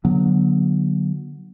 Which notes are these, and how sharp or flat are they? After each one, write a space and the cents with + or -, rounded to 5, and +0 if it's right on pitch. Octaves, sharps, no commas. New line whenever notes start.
D3 +0 F#3 -5 B3 -35